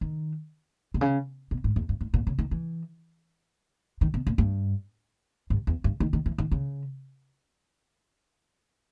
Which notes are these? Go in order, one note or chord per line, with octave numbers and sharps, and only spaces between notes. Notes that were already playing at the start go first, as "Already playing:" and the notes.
D#3
B2
C#3
B2
G#2
E2
G2
G#2
A#2
C#3
D#3
E3
D#3
B2
A#2
G2
G2
E2
G2
D#3
D#3
E3
D#3
C#3